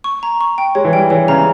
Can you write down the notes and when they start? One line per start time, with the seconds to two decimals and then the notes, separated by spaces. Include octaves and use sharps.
0.04 C#6
0.23 A#5
0.41 C#6
0.58 G5
0.75 G#3 C#5
0.85 E3
0.93 G3 G5
1.10 E3 C#5
1.28 C#3 A#5